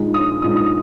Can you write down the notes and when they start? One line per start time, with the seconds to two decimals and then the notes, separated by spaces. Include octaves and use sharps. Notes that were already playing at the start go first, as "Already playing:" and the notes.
Already playing: A#2 G#3 D#4
0.14 D#6
0.42 A#2 G#3 D#4 D#6
0.57 D#6